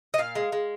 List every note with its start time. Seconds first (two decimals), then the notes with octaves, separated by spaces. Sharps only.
0.14 D#5
0.18 A#2 F5
0.35 G#3
0.52 G#3